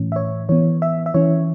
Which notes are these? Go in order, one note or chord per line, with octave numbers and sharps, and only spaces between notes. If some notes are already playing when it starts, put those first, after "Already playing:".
Already playing: A2 E3 C#4
E5
C#5
E3 B3 C#5
E5
E5
E3 C#4 C#5